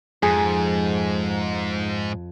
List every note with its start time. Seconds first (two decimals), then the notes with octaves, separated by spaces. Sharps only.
0.23 F2 G#2 G#4